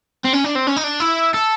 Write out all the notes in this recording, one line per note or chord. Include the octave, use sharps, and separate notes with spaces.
C4
C#4
D4
C4
C#4
D#4
D4
E4
A4